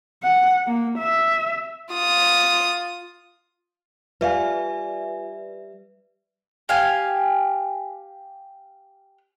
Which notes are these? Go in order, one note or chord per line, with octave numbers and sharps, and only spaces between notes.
F#5
A#3
E5
F4 D#6
G3 F4 B4 D5 E5 F5 G#5
G4 F5 G#5